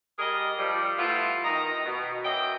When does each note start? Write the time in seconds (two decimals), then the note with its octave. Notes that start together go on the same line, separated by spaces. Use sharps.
0.19 G3 G#4 A#4 D#5
0.58 F3 G3
0.98 A3 B3 E4 F4
1.44 D#3 D#4 D#5 A#5
1.85 B2
2.24 F#2 E3 F#3 D#5 G5